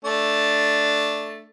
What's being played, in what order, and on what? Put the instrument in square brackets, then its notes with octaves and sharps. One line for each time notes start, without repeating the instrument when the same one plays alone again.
[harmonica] A3 D4